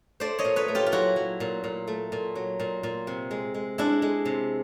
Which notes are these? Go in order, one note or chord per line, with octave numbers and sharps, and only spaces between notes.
A3 C5 D5
C#5 D#5
A#2
B4 C#5
A3
F4 G4
F4
F#3 E4 F#4
F#3
A#2
A#2
A3
A#2
F#3
A#2
A#2
C3
G#3
G#3
G#3 D4 E4
G#3
C3